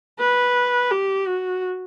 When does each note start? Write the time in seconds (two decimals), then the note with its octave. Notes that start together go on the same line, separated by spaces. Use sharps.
0.19 B4
0.91 G4
1.26 F#4